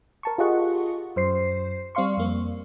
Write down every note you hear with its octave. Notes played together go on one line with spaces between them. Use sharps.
A#4 A5 C#6
F4 G4 G#4 D#5 F#5 C#6
F#2 C5 C7
G3 C4 D5 F5 C6 C#6
F2 A#3